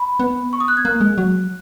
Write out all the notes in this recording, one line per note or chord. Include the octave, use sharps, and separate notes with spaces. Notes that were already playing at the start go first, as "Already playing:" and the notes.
Already playing: B5
B3
C#6
D#6
F#6
G#6
A#3 F#6
G#3
F#3